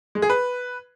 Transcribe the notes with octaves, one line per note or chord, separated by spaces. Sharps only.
G#3
G#4
B4